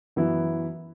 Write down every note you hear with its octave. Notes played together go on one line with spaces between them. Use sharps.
F#2 E3 B3 E4